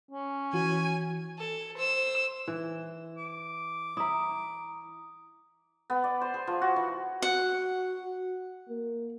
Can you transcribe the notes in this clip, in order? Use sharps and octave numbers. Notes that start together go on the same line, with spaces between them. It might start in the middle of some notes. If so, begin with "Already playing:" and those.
C#4
E3 F#4 G#5
A4
C5 E6
E3
D6
E4 E5 A#5 D#6
B3
D5
C5
G#4
F3
F#4
E3
F#4 F#5
A#3